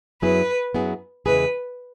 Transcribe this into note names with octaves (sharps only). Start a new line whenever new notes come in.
F#2 F#3 B3 E4 G#4 B4
F#2 F#3 B3 E4 G#4
E2 C#3 G#3 E4 G#4 B4